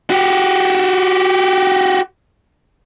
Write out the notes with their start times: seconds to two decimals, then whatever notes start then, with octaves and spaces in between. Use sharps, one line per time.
0.10 F#4 G4